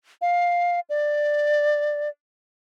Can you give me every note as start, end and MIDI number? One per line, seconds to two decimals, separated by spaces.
0.21 0.80 77
0.89 2.09 74